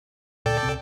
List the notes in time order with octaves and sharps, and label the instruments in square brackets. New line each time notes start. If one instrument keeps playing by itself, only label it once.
[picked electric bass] D2 A#2 [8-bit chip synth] A4 D5 G5
[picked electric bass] C#2 C3 C4